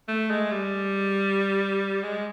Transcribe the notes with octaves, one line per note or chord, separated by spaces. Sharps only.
A3
G#3
G3
G#3